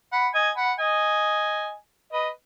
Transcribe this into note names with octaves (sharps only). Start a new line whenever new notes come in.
F#5 B5
D#5 G#5
F#5 B5
D#5 G#5
B4 D#5